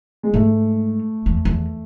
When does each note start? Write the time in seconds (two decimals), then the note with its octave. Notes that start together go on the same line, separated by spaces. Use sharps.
0.23 G#3
0.34 G#2 A3
1.26 E2
1.45 E2